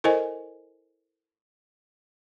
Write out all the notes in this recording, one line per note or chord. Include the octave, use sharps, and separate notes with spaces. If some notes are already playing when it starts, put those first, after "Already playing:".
E4 A4 A#4 C5 D#5 G#5